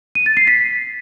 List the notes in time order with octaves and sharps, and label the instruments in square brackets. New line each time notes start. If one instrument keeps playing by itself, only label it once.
[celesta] D#7
A6
C7
B6